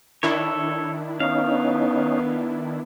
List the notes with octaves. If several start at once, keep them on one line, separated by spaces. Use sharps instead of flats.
D#3 D4 E4 A4 C#5
B3 C#4 D#4 F5